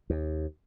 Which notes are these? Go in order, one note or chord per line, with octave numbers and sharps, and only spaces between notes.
D#2